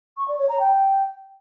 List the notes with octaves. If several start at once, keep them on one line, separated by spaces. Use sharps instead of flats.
C#6
D5
C#5
A#5
G5